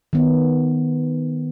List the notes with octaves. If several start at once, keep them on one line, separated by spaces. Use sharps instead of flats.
D#3 B3